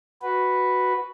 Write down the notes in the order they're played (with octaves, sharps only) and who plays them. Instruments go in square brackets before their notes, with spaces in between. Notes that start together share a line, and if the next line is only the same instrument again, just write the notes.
[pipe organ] F#4 B4